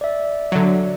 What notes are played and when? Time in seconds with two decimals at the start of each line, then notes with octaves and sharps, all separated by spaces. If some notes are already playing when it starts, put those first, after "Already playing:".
0.01 D5 E5
0.52 D3 F#3